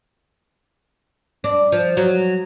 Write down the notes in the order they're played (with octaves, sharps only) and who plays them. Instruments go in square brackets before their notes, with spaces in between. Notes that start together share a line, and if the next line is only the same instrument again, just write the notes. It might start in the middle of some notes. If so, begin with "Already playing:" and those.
[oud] D4
F3
F#3